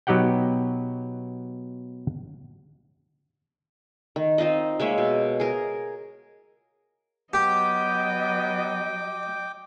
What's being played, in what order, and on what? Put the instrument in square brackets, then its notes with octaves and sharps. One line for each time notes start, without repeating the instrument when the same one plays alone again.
[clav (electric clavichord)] B2 F#3 D#4 G4 F#5 G5
[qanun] D#3
C4 D#4 F4 D#5
G#3 A#3 C#5 E5
B2
G#4 A#4
[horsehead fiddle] F#3 D#5 [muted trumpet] B3 [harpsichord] G4 [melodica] G5 D6